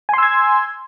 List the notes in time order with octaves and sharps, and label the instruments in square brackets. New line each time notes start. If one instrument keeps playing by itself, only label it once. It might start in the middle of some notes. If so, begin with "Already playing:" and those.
[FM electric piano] G#5
C6
E6
G#6